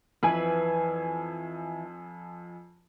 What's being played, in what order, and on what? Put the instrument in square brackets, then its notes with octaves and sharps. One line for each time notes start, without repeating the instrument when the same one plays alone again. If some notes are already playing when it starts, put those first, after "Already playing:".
[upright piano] F2 G#5 [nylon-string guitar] E3 B4